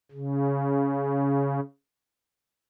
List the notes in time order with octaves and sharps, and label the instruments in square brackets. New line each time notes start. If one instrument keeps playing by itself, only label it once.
[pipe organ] C#3